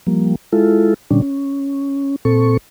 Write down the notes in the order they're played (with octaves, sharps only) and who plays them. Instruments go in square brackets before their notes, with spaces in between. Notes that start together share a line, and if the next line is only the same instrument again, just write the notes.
[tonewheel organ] F3 G3 A#3
G#3 E4 F4 A4
A#2 D3 G3 C#4 D4
C#4
A#2 C4 A4 C#6